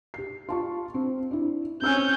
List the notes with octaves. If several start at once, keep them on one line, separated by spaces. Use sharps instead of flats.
G4 C7
F4 A5 C#6
C4
D4 E4
C4 C#4 E6 F6 G6